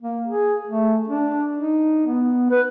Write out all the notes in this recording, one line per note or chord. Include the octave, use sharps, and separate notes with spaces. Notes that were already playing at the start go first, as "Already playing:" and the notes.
A#3
G#4
A3
D4
D#4
B3
B4